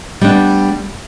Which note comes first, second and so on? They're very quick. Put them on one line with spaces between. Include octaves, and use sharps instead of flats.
G3 D4 B3